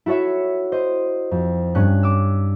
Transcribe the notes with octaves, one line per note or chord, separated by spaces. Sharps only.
E4 F#4 A4 C#5 E5
C5 D#5
F2
G2 C#4 F#6
D6 E6